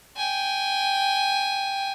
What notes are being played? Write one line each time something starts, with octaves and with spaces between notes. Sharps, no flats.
G5 G#5